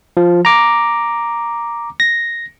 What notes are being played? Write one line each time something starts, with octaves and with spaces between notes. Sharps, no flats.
F3
A#5 D6
A#6